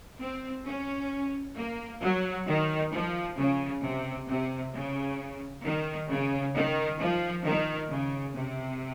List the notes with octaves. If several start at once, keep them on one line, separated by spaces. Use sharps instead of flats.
C4
C#4
A#3
F#3
D#3
F3
C#3
C3
C3
C#3
D#3
C#3
D#3
F3
D#3
C#3
C3